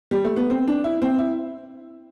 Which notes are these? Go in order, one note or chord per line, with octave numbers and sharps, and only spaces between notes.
G3
A3
B3
C4
D4
E4
C4
E4